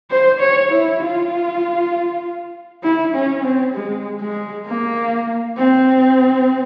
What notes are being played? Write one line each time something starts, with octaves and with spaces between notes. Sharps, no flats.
C5
C#5
E4
F4
E4
C#4
C4
G#3
G#3
A#3
C4